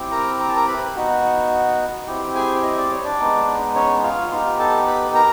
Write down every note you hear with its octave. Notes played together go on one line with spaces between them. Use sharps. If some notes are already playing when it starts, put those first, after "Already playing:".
Already playing: C4 E4 G4
A#4 A#5
A#5
A5
A#4 A#5
B4 B5
B3 D#4 F#4
C4 E4 G4
G#4 G#5
D#5
D5
C#5
D4 D5
G#3 B3 D#4
C#4 C#5
F4 F5
B3 D#4 F4 G4 F5
A4 A5
B4 B5
A#4 A#5